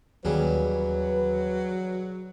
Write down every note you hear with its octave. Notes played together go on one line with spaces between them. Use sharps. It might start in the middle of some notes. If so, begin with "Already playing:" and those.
D#2 C#3 E3 F#3 G3 B4